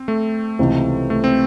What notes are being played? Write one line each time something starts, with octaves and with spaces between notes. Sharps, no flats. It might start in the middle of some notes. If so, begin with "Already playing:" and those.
Already playing: C4
A3
C#2 C3 E3
A3
C4